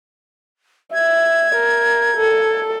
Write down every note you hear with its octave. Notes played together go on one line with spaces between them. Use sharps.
E5 G#6
A#4
A4